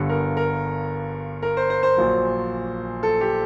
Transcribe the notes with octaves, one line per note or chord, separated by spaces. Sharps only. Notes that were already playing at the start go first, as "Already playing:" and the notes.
Already playing: G1 G2 D3
A#4
A#4
A#4
C5
C5
C5
A#1 A#2 F#3
A4
G4